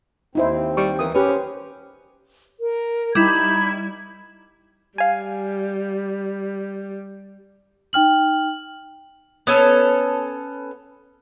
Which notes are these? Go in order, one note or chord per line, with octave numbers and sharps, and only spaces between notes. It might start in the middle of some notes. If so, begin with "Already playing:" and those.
D#2 C4 D#4 E4 C5
G3 C#6
E3 A#4 D#6
C#4 G4 B4
C5
A#4
G3 D#4 E4 B5 G#6
G3 F5 G#5
D#4 G5 F6 F#7
B3 C#4 A4